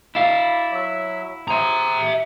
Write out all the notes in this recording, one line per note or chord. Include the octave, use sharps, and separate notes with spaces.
E4 D5 F5 B5
F#3 E5
C4 G#4 E5 A#5